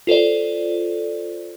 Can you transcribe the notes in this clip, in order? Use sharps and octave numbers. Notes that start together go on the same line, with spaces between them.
F4 A4 C5 D5